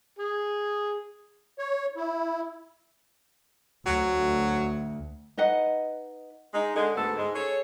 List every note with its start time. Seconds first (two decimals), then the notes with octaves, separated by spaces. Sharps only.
0.19 G#4
1.59 C#5
1.96 E4
3.86 D2 F#3
5.37 D#4 B4 D#5 F#5
6.54 G#3 D#4
6.75 D3 G#3
6.96 D2 G#2 B3 A4
7.17 G#2 G#3
7.34 G#4 A4 C#5